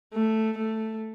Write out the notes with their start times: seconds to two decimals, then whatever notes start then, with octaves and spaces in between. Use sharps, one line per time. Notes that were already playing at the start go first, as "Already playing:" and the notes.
0.13 A3
0.57 A3